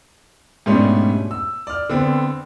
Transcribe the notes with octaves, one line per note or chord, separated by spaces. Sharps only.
G#2 B2 G3 A3 C#4 D4
E6
D5 F6
D3 B3 C4